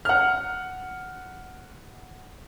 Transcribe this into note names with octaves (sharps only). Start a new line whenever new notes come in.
F#5 F6